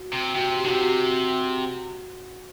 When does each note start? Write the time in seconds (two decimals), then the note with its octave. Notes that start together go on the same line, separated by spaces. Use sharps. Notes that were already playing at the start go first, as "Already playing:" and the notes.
Already playing: F#4
0.13 C3
0.35 C3 F#4
0.58 G4
0.64 D3 F#4
0.70 C3 G4
0.81 F#4